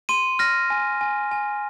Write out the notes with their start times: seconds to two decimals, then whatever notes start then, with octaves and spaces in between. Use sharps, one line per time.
0.09 C6 D#7
0.39 F6 A#6
0.70 G#5
1.01 G#5
1.31 G#5